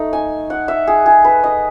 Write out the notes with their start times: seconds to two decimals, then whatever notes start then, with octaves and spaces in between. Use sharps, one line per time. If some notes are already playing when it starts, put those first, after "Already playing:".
Already playing: A3 D#4
0.13 G#5
0.50 F#5
0.68 E5
0.87 G#4
1.06 G#4
1.24 B4
1.44 D#5